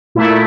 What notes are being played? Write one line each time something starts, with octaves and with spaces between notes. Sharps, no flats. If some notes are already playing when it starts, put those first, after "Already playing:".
A#2 A3 E4